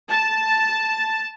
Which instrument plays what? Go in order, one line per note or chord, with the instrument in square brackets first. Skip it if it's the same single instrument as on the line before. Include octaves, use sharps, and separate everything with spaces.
[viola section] A5